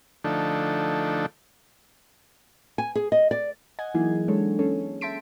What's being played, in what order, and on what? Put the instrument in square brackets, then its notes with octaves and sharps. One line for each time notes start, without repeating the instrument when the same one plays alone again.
[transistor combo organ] D3 F3 A3 D4 D#4 A4
[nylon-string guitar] G#5
G#4
D#5
D5
[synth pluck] D#5 F#5 G#5 G#6
E3 F#3 A#3 D#4 E4 G#4
G#3 D4 A4 C#5
C#4 G#4 A4 C#5
E5 G5 A5 C6 B6 D7